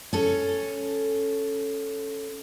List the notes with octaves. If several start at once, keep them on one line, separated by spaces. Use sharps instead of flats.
C#4 A4